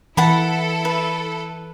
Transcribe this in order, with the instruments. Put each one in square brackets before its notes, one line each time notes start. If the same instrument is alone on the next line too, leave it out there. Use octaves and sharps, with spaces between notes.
[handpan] E3 [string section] E4 A4 [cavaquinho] F#5 A5 B5
[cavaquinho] B4